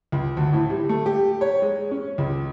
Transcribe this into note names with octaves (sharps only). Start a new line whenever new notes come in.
C#2
D2
A2
G3
A3
G4
C#5
G#3
C#4
C#2